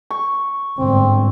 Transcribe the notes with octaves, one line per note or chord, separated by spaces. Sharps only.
C#6
G1 G#2 C4